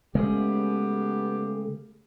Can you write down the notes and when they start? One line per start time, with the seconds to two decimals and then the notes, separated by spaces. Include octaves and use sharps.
0.15 C#3 G#3 A3 B3 C#4 G4 G#4